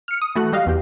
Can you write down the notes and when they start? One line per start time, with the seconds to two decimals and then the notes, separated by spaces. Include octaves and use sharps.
0.08 F6 C#7
0.22 D#6
0.35 E3 A3 F#4 F#6
0.53 G3 D#5 F5
0.66 E2 G4